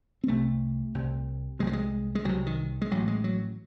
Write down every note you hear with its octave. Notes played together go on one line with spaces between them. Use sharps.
C4
C2 C3 A3
C2 C3
C2 C3 G#3
F#3
G#3
G#3
C2 C3 F#3
D#3
G#3
A1 A2 F#3
G#3
F#3